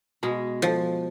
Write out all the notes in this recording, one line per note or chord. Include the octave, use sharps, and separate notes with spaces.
B2 G#3
F3